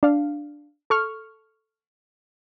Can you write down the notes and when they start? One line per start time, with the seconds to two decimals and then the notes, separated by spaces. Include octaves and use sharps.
0.03 D4 F5
0.90 A4 C#6 F6